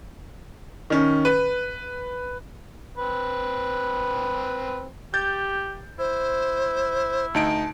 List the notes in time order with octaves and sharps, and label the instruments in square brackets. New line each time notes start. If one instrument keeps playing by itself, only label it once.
[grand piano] D#3 C#4
B4
[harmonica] C4 B4
[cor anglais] G4 [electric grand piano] G6 A6
[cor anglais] E4 [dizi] C5
[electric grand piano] D2 D#4 D7 [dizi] A5